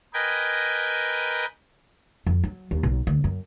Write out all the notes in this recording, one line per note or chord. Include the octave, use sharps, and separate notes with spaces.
A#4 B4 D#5 G5 G#5
F2
F#3
D#2
B1
D2
F#2